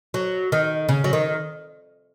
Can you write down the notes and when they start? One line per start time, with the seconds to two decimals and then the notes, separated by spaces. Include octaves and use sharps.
0.14 F#3
0.52 D#3
0.89 C#3
1.04 F#3
1.13 D#3